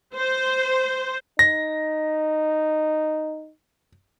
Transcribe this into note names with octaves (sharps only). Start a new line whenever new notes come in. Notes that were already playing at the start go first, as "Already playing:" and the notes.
C5
D#4 A#6